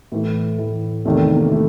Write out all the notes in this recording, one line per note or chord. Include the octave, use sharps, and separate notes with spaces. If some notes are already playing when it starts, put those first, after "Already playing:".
A2 E3 A3
A2 E3
E2 C3 D#3 A3
A#3
A3